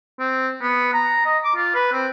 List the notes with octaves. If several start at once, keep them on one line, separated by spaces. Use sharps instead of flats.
C4
B3
A#5
D#5
D6
F4
B4
C4